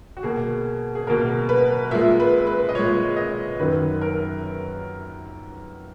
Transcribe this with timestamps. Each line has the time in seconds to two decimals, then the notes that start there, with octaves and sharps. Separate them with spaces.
0.17 F#4
0.23 B2 A#3 G#4
0.95 G#4
1.07 B2 A#3 A#4
1.49 B4
1.91 A#2 G#3 E5
2.20 B4
2.47 B4
2.69 D#5
2.75 A#2 G#3 C#5
3.16 D#5
3.59 F#2 D#3 F#3 B4
4.01 A#4